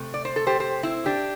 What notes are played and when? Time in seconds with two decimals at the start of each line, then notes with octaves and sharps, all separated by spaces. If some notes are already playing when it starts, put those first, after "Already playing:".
Already playing: C3 A3
0.14 D5
0.25 C5
0.36 A4
0.47 G4 C5
0.60 G4 C5
0.83 C4 E4
1.06 D4 G4